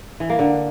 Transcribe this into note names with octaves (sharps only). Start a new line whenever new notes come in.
E3
A#3
D3